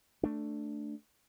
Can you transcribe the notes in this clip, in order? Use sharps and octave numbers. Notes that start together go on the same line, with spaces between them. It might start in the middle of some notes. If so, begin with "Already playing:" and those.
A3 D4